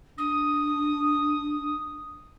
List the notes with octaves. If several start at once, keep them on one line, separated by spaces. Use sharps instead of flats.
D4 D#6